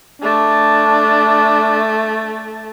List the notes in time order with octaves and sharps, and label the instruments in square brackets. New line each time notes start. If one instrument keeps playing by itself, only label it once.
[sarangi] A3 [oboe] D4